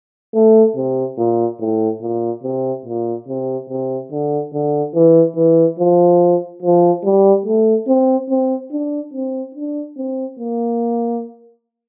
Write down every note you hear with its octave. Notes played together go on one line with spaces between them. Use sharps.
A3
C3
A#2
A2
A#2
C3
A#2
C3
C3
D3
D3
E3
E3
F3
F3
G3
A3
C4
C4
D4
C4
D4
C4
A#3